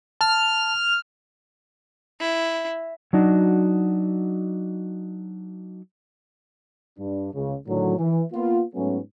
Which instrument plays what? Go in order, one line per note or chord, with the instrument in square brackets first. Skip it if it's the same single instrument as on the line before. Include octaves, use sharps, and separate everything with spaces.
[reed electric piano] A5 [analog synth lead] F6
[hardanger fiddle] E4
[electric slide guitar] F#3 D4 D#4 F#4
[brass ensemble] G2 D4
C#2 C#3
A2 D3 D#3 F#3
E3
A#3 B3 F4
G#2 F#3 A3 B3 C#4